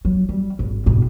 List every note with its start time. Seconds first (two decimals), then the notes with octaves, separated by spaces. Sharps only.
0.05 F#3
0.29 G3
0.59 G#1
0.86 G#2 B2